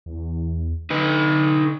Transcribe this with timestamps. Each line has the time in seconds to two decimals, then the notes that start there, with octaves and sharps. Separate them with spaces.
0.06 E2
0.90 D3 D#4 B4